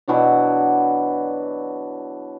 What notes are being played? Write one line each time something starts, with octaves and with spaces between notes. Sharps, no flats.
B2 E3 F#3 D4